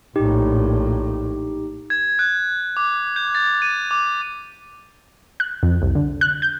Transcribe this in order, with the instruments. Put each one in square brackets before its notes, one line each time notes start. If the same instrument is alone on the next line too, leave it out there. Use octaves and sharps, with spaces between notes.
[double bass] A#1 A2 [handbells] D#4 G4
[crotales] G#6
F#6
D6
G6
A6
D#7
D6
[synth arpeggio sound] F#6
F2
C2
D3
F#6
G6